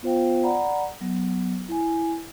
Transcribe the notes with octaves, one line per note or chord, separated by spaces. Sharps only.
B3 F4 C5 F5 G5
D5 F#5 A#5 B5
F#3 B3
E4 G#5